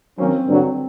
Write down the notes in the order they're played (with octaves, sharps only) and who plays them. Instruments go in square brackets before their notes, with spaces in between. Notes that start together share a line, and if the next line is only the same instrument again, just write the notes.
[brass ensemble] D#3 F#3 A#3 C#4 [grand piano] C4
[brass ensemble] G2 D3 F#3